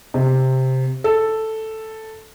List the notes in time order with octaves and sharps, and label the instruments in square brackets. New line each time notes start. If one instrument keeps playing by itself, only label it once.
[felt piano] C3
A4